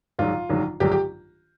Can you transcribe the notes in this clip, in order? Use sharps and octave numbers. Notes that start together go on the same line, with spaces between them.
A#1 G#2 D#3 F#3 F4
A#1 G#2 D#3 F#3
A#1 G#2 D#3 F#3 G4
G4